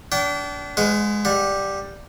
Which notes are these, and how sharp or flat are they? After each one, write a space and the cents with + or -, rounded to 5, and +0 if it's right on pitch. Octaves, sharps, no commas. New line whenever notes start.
D4 -30 G5 -40
G#3 +0 B4 +35 F#5 -30
G3 +0 F#5 -25